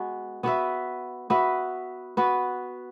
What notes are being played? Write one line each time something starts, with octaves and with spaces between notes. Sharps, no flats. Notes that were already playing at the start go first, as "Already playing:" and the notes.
Already playing: G#3 B3 F#4
B3 F#4 B4 E5
B3 F#4 B4 E5
B3 F#4 B4